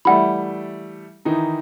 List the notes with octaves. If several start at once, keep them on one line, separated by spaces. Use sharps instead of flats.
E3 G3 A3 F#5 B5
D#3 E3 D#4